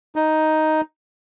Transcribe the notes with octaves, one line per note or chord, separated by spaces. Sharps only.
D#4